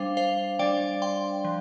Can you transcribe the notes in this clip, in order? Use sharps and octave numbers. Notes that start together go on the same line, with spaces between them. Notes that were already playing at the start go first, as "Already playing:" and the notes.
Already playing: G3 D4 C5 F5
C5 F5
G3 D4 D5 G5
G5 C6
F3